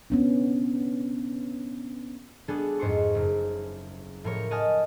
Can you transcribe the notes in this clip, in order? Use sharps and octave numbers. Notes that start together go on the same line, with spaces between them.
B3 C#4 D4
G3 B3 D4 F#4 G#4 A4
F2 G#2 C5 C#6
F#1
A2 F3 A#4 C#5 C#6
D#5 F#5 G#5 A5 D#6 F6